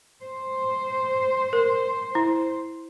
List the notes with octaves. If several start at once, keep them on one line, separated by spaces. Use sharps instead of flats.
C5
A#4
E4